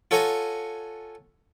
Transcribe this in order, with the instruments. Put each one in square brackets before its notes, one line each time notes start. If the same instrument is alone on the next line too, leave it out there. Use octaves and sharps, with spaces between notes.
[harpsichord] F4 A4 C#5 F#5 G#5 A#5